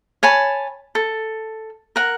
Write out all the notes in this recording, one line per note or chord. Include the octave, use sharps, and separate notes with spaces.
C#5 G#5 A5 B5
A4
A#4 F#5